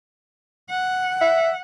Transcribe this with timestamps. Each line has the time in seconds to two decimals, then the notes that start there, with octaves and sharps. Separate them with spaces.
0.70 F#5
1.21 E5